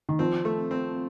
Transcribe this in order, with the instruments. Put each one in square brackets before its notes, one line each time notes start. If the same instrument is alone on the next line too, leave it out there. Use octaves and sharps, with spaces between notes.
[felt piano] D#3
[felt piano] F3 [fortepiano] C4
[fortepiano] A3
C4